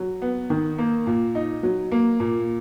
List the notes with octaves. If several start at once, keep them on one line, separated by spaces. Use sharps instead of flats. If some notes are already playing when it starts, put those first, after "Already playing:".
Already playing: F#3
B3
D#3
A#3
A#2
D#4
F#3
A#3
A#2